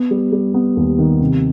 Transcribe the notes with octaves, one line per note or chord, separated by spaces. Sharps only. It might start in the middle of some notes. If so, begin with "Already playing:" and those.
Already playing: B3
G3
G3
B3
D#2
D#3
C3